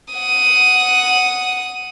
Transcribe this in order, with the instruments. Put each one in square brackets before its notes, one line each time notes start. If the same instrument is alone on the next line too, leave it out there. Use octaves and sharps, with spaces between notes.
[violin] F#5 D#6